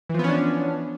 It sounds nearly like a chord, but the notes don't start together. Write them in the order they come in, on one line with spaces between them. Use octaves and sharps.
E3 F3 B3 C#4 D4